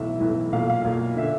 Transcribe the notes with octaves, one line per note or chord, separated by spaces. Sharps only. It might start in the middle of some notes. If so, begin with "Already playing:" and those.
Already playing: B1 A2 E3 E5
B1 A2 E3
B1 A#2 F5
F5
B1 A#2
D3 E5